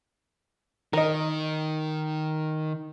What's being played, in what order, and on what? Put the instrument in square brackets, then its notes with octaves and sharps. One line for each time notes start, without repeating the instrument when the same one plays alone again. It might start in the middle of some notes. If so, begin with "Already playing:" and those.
[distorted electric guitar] D#3 [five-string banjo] A#4 D#5